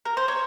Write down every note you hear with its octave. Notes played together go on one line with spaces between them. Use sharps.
A#4
C5
C#5